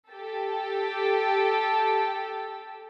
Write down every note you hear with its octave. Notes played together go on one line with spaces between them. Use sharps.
G4 A4